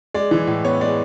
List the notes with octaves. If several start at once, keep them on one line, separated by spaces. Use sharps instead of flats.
G#3 D5
E3
A2
B3 C#5
G#3 D5